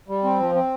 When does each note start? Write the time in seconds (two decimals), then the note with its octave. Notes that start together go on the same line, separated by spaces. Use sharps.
0.08 G3
0.24 C4
0.40 F3
0.55 C4